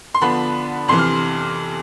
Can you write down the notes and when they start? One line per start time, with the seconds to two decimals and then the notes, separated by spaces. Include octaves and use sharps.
0.14 C6
0.21 D3 F3 B3 D4 B5
0.88 F2 C3 E3 C6
0.98 F6